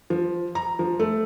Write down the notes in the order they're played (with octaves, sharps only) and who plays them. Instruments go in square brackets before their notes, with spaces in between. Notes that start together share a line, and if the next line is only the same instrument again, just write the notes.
[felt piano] F3
A#5
F3
A3